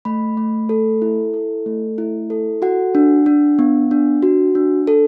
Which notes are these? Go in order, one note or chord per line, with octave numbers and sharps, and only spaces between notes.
A3 B5
A3
A4
E4
A4
A3
E4
A4
F#4 F#5
D4
D4
B3
D4
F#4
D4
A4